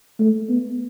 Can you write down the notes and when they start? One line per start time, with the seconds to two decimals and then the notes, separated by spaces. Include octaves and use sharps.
0.19 A3
0.49 B3